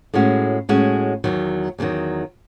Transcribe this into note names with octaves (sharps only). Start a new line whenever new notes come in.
A2 G#3 C#4 F#4
A2 G#3 C#4 F#4
E2 C3 D#3 F#3
E2 C3 D#3 F#3